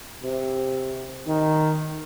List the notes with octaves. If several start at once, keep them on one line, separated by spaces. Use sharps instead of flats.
C3
D#3